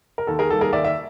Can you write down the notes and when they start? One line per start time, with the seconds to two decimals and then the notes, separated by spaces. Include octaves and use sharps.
0.18 A#4
0.27 D#2 A4
0.39 G#4 A#4
0.50 D#3 G3 A#3 A4
0.61 G#4 A#4
0.73 D#2 D5 E5
0.84 E5